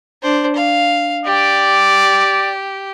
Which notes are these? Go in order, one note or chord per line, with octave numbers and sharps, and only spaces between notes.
D4 C5
F5
G4 D5